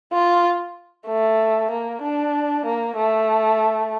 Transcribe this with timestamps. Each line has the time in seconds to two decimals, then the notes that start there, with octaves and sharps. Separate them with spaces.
0.13 F4
1.07 A3
1.71 A#3
2.02 D4
2.66 A#3
2.97 A3